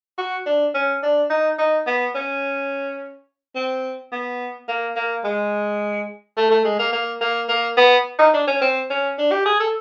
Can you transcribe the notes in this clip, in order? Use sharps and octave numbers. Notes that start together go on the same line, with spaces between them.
F#4
D4
C#4
D4
D#4
D#4
B3
C#4
C4
B3
A#3
A#3
G#3
A3
A3
G#3
A#3
A#3
A#3
A#3
B3
D#4
D4
C#4
C4
C#4
D4
G4
G#4
A4